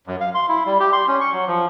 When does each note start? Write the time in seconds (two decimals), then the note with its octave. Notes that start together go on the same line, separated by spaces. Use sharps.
0.07 F#2
0.21 F5
0.35 C6
0.49 E4
0.66 G3
0.80 G4
0.93 C6
1.08 C#4
1.21 C#6
1.33 F#3
1.47 F3